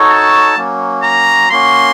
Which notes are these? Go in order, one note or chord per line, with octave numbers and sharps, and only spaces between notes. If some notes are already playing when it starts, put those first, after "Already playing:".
Already playing: D#4 F#4 A4 C#5
A5
F#3 A#3 C#4
A#5
A#3 C#4 F#4 C6